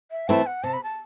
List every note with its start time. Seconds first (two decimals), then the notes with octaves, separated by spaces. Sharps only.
0.11 E5
0.28 E3 A3 C4 E4 A5
0.46 F#5
0.64 C3 A5
0.73 B5
0.83 A5